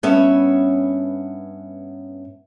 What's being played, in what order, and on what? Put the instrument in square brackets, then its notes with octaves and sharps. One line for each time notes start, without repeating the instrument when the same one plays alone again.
[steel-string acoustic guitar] G2 B3 C#4 C#5 E5